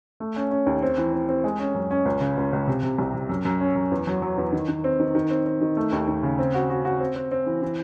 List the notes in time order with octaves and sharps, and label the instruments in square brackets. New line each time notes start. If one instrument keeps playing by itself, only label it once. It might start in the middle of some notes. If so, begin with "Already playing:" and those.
[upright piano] A3
C#4
C#4
D#2
C4
E3
C4
C4
G#3
C#4
F#2
C#4
C#2
C#3
C#2
C#2
C3
C3
C2
C3
F#2
F#2
C#4
F#2
E2
F#3
F#3
E2
D#3
D#3
C4
D#3
D#3
C4
C4
D#3
A3
D#2
D#2
C#3
C4
F#4
F#4
F#4
C4
C4
C4
E3
E3